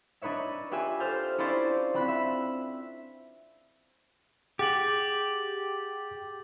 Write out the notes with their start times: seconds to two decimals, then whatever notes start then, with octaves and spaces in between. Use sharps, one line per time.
0.22 D4 D#4 B4 C#5 E5
0.71 F4 G4 B4 E5 G#5
1.00 A4 C5 F6 G6
1.38 C#4 D4 E4 F4 C5 D5
1.94 C4 F4 B5 F#6 B6
2.08 E5
4.59 G4 G#4 F#5 D6 A6 F#7